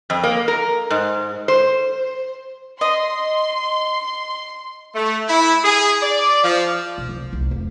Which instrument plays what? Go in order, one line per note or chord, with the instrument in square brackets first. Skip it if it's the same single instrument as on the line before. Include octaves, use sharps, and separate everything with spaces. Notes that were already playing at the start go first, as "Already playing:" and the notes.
[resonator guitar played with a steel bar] F2
A#3
A#4
G#2
C5
[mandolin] D#5 [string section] C6
[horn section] A3
E4
G#4
D5
F3
[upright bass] B1
C2
C2
F1